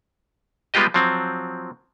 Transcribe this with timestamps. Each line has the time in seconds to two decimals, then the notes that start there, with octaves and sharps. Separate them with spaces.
0.74 G3 G#3 B3 F4 G4 D#5
0.94 F3 F#3 C4